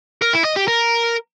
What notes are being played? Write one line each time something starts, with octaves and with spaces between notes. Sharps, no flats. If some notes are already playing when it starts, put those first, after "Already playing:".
A#4
E4
D#5
G4
A#4